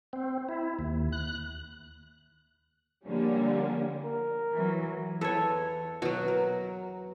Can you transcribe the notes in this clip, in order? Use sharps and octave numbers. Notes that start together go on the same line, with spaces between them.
C4
E4
D#2
F#6
D3 F3 G3 A#3 C#4
A#4
E3 F#3
E2 A4 B4 C#5 E5
B2 F#3 F#4
A#4